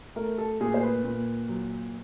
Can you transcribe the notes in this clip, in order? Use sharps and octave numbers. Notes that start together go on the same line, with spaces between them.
A3 A#4
A4
A#2 G#4
C5
B4
A#2
F#3